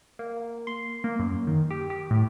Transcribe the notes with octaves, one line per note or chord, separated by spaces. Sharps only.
A#3
C6
A#3
F#2
D#3
G4
G4
A2